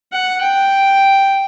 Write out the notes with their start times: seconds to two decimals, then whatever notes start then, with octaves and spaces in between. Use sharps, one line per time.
0.12 F#5
0.41 G5